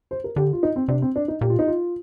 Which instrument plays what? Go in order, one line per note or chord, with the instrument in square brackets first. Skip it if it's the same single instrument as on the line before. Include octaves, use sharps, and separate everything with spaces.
[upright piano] C5
A#4
[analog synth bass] D3 [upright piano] G4
[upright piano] F4
D#4
C4
[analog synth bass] C3 [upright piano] D4
[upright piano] C4
D4
D#4
[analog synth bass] A#2 [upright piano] G4
[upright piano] F4
D#4
F4